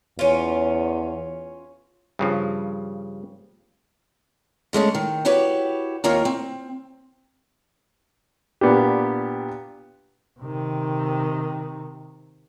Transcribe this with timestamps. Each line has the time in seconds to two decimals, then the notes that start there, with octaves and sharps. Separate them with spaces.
0.19 E2 C#4 F4
2.19 G2 C#3 F3
4.73 C#3 G#3 A3 C#4
4.95 D#3
5.25 E4 F#4 G4 B4 C#5
6.04 D#2 A#3 F4 A#4 C#5
6.25 C4
8.61 A#2 B3 D4 G4
10.40 C3 D#3